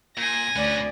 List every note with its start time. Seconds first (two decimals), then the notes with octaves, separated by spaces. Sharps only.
0.17 A#2 G#5 A#6
0.56 D2 C#4 B4 D5